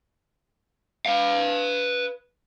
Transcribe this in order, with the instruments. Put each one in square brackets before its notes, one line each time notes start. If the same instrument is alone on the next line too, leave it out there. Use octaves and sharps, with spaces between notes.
[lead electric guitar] B4 F5